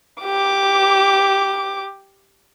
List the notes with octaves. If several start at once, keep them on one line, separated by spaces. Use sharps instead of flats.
G4 D6